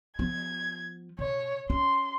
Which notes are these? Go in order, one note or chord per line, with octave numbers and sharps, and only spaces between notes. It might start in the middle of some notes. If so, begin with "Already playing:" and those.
F3 B3 G#6
B2 C#5
C#4 C6